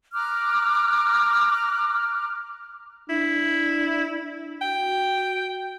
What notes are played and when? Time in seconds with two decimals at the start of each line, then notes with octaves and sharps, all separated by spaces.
0.13 A#5 D6 F6 F#6
3.10 D4 E4
4.62 F#4 G5